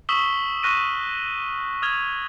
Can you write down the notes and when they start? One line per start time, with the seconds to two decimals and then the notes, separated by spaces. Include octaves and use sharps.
0.09 C#6 D#6 E6 B6 E7 G7
0.63 C#6 F6 F#6 A#6 B6 D#7
1.82 D#6 F6 G#6 F7